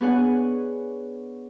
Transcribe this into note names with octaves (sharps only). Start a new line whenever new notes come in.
B3 D4 G#4 C#5 F#5 G#5